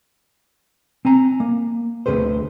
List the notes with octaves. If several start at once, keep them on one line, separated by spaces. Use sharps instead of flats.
C4 G#5 A#5
A#3
D2 C3 G#4 B4 C5